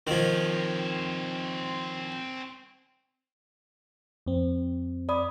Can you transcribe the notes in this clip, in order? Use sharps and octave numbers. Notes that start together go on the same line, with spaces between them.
D#3 F3 C4 C#5
F2 C4
D5 B5 D#6